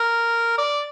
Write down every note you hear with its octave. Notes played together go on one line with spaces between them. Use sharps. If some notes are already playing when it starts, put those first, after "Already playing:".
Already playing: A#4
D5